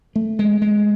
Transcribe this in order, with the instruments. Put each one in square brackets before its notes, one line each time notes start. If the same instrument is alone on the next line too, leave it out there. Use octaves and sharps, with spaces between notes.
[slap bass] A3
G#3
G#3